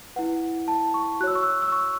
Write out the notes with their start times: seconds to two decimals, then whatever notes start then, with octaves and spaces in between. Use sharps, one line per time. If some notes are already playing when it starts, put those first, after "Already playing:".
0.16 E4 B4 F#5
0.68 A5
0.94 C#6
1.20 F#4 F#6
1.23 C#5 E6
1.35 C#6
1.43 E6
1.62 E6
1.72 C#6